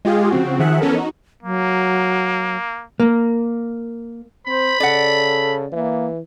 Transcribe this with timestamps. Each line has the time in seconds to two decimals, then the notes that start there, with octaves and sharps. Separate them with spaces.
0.05 G#3 F4 G4 G#4
0.31 C#3 F3 C4 F#4
0.59 D#3 F3 G#4 E5 F#5 F#6
0.81 E3 B3 C#4 A4 A#4
0.96 D#4 F#4
1.43 F#3 A#3
3.00 A#3
4.47 C4 C5 B5
4.80 C#3 A4 D5 F#5
5.72 E3 A#3